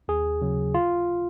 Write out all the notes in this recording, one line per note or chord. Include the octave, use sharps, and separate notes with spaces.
D#2 G#4
C#3 F#3
F4